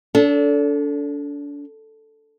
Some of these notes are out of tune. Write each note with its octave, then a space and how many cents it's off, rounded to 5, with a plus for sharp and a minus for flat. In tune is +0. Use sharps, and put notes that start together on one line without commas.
D4 -35 A4 +0